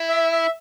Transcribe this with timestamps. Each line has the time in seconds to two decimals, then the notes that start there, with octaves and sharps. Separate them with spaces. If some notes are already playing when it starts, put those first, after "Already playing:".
Already playing: E4
0.09 E5
0.32 E5